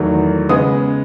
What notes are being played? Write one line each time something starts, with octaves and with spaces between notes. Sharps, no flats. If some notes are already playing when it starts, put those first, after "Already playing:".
Already playing: E2 D#3 F#3 A3
C#3 G#3 B3 D#6